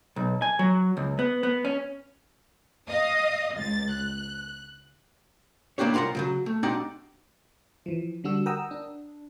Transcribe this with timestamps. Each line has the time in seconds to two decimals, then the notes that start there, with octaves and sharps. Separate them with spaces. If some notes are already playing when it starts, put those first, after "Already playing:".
0.16 B1
0.42 G#5
0.59 F#3
0.97 C#2
1.19 B3
1.43 B3
1.65 C#4
2.88 D#5 F5 D#6
3.55 C#2 A6
3.92 F#6
5.78 D#3 A#3 B3 D4 G4 C#5
5.94 C2 F4 A#4 F5 F#5
6.15 C#3 F3 F#3
6.46 A3
6.63 F#3 C4 D4 D#4 G4 F#5
7.86 E3 F3
8.24 D3 G3 D4 F#4 E6
8.46 A#4 F#5 G5 A#5 D#6 E6
8.71 D4